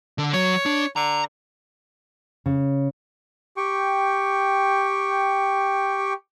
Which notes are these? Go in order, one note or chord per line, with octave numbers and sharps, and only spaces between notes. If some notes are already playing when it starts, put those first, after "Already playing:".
D3 D4
F#3 C#5
D4
D3 A#5
C#3
G4 G5 C#6